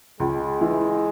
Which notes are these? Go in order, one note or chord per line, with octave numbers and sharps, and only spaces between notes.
C#2 G#3
E3